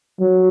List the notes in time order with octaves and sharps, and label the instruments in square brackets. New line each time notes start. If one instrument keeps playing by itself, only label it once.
[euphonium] F#3